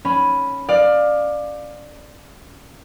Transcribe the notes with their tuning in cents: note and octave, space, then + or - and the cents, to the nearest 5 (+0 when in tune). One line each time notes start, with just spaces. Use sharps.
C#4 +0 B5 +0
D5 +20 F5 +15